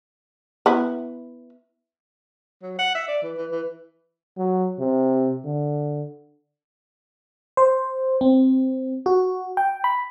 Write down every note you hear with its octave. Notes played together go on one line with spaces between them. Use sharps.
B3 E4
F#3
F#5
E5
D5
E3
E3
E3
F#3
C3
D3
C5
C4
F#4
G5
B5